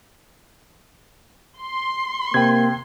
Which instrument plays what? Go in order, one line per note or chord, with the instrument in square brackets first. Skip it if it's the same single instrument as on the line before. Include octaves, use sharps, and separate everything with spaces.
[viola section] C6
[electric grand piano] C3 [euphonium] A#3 [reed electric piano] G5 G#6